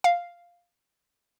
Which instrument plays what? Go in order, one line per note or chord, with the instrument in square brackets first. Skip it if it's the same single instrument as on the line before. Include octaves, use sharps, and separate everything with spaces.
[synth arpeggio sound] F5